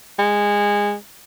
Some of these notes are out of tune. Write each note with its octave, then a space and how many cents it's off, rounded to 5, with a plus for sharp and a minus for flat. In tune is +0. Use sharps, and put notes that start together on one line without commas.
G#3 -20